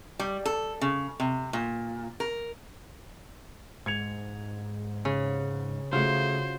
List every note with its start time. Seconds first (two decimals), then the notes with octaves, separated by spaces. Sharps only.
0.19 G3
0.46 A4
0.81 C#3
1.20 C3
1.53 A#2
2.20 A#4
3.86 G#2 G#6 C#7 F7
5.05 C#3
5.93 C#3 A3 F4 F#4 C5